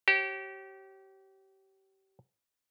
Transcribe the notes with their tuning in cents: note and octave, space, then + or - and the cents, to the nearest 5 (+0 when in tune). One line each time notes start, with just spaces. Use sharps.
G4 -30 C#5 -35